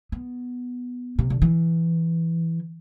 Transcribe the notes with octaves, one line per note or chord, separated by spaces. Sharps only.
B3
C3
D3
E3